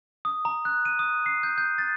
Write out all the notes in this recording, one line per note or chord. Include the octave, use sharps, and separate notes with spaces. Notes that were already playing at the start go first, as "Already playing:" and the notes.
D#6
A#5
F#6
D#7
D#6
C7
G6
G6
A6